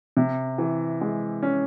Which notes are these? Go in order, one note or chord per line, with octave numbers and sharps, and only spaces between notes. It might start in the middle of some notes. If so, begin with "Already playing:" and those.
C3
E3
G#3
C#4